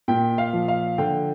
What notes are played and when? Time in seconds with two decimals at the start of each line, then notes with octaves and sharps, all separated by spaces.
0.08 A#2 G5
0.38 F5
0.53 F3
0.68 F5
0.98 D3 G5